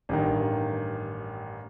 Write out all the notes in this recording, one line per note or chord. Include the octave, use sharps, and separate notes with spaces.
A1 G2 D#3